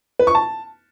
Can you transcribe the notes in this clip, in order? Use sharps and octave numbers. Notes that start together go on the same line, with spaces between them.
B4
C#6
A5